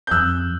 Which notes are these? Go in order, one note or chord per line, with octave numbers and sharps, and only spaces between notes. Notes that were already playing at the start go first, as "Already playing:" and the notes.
G6
F2 E6 F#6